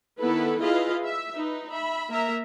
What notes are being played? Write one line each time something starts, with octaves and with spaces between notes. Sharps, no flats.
D#3 B3 E4 A4 B4
E4 F4 G#4 B4 D#5 F5
E5
D#4 B4
E5 B5
A#3 A#4 E5 A#5